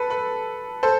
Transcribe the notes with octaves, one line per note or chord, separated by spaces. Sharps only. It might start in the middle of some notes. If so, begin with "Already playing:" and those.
Already playing: A4 B4
B4
A4 C5